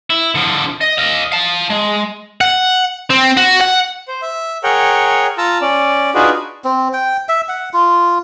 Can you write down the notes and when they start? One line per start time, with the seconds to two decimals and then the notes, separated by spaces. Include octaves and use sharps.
0.10 E4
0.35 D3 F3
0.81 D#5
0.98 D#5 F5
1.32 F5 A5
1.70 G#3
2.41 F#5
3.11 C4
3.37 F#4
3.61 F#5
4.08 C5
4.22 E5
4.64 G#4 A#4 C#5 F#5 G5
5.38 F4 A5 A#5 E6
5.61 C#4 D5
6.15 D4 D#4 F4 F#4 G#4 B4
6.64 C4
6.93 G5
7.29 E5
7.49 F#5
7.73 F4